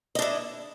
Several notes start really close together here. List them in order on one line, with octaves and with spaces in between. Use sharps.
D#5 D4 E4